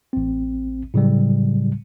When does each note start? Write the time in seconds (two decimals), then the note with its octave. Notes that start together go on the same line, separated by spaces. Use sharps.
0.13 A1 C4
0.94 A2 C#3 F#3 G3